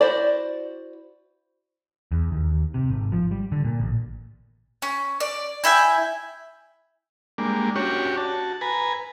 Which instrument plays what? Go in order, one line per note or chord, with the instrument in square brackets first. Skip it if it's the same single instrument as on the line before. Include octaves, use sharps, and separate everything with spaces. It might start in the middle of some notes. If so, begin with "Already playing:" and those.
[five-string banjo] E4 F#4 C5 D5
[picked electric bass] E2
D#2
C3
G#1
F3
G3
D3
A#2
A1
[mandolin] C#4
D5
E4 E5 G5 G#5
[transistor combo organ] G3 G#3 A#3 D4
C#4 D4 F#4 G4 C#5
F#4 A5
B4 G#5 A#5